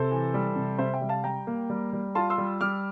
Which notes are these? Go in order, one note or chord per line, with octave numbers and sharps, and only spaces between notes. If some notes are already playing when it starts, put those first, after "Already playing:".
Already playing: C3 A4 C5
E3
G3
C3
C3 C5 E5
E5 G5
G3
F5 A5
G3 G5 A#5
A#3
G3
G3
F4 A5 C6
C6 E6
G3
G3 D6 F6